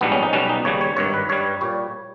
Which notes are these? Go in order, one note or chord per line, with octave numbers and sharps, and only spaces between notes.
A#1 G#2 G3 B3
C#4
D#4
B1 B2 G3 C#4
D#4
D#2 C#3 G3 C#5
C#5
G#1 G2 D#3 C#5
B4
G2 G3 C#5
A#2 G3 C#5